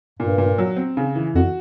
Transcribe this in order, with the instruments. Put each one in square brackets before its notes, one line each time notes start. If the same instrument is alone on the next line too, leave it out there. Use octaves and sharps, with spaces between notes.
[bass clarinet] G2 [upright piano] A#2
[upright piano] A#2
F#3
C4
C#3
E3
[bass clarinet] F2 [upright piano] F#4